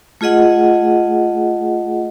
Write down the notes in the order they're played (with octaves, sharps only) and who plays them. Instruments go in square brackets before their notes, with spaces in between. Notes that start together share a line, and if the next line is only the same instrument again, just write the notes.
[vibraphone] A3 F4 G#4 D#5 F#5